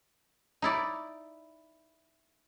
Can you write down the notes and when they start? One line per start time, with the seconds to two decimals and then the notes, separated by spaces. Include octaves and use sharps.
0.62 D#4 E4 D5